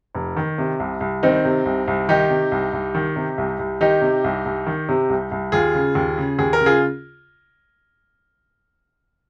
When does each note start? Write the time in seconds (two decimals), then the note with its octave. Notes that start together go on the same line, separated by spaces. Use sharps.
0.15 F1
0.37 D#3
0.58 C3
0.80 C2
1.01 C2
1.23 D#3 C4 D#4
1.45 C3
1.65 C2
1.87 C2
2.09 D#3 D#4 G4
2.30 C3
2.52 C2
2.73 C2
2.95 D#3
3.16 C3
3.38 C2
3.59 C2
3.81 D#3 D#4 G4
4.02 C3
4.24 C2
4.46 C2
4.67 D#3
4.89 C3
5.09 C2
5.31 C2
5.52 D#2 F4 G#4
5.75 C#3
5.95 D#2
6.18 C#3
6.39 D#2 G#4
6.53 A#4
6.61 C#3
6.66 F4 G#4